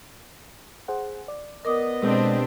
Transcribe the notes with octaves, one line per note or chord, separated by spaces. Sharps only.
G#4 C5 F#5
D5
B3 A#4 D#5 D6 D#6
B2 G#3 C4 D4 G4